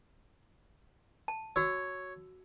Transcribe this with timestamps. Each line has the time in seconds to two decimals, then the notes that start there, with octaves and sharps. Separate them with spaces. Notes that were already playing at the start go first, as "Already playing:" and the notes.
1.28 A5
1.56 F#4 C#5 E6